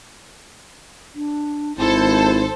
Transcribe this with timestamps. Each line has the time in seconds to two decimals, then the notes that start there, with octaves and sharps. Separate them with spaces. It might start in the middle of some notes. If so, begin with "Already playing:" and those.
1.15 D4
1.78 G#1 E4 A4 C5